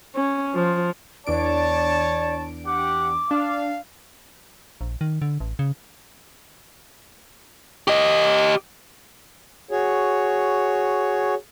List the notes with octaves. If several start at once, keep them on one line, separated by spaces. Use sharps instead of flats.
C#4
F3
E2 D4 C#5 D5 A5 D7
G4 F#5 D6
D4 F5
A#1
D#3
D3
A1
C#3
G4 D#5
F#4 G#4 C#5